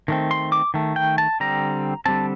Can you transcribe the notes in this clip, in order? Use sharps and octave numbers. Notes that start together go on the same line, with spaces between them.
D#3 A3 C4
C6
D6
D#3 A3
G5
A5
D3 G3 C4 A#5
D3 G3 C4 A5